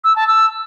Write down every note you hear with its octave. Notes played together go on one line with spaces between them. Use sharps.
E6
A5
E6